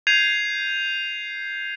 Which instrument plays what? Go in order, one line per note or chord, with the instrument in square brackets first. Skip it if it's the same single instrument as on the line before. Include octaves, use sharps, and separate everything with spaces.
[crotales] G6 G#6 C7 D#7 F7